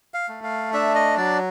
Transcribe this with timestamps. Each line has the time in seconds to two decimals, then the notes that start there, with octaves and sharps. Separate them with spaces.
0.14 F5
0.29 A3
0.44 F5
0.73 D4 E5
0.95 D#5
1.17 F#3 D5